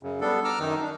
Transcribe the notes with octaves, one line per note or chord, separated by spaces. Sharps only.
F#2 C#3
G3 B3 D4 A4
A#5 D6 E6 F6
F#2 D#3 D#4
D4